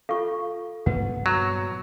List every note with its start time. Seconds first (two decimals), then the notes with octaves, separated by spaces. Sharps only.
0.09 F4 A4 F5 C#6
0.86 G2 A#2 B3 B4 F#5
1.26 F#3